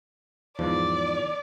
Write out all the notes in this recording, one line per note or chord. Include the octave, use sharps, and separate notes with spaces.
E2 G#2 F3 D5